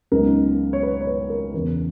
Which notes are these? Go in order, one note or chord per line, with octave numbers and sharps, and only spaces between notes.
C#2 C#3 F#3 B3 D#4 A#4
C#5
B4
C#5
B4
A#4
E2 C#3 E3 A#4